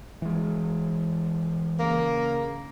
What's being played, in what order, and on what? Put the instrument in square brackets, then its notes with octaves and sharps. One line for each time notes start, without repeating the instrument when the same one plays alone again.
[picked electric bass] E3 G#3
[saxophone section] C#3 A#3